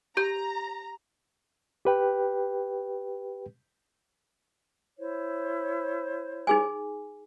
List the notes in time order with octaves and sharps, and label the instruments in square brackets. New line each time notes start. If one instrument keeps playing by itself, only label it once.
[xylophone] G4 G6 [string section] A#5
[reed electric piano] G4 B4 G5
[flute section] E4 C5 C#5
[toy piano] D#4 G#4 G#5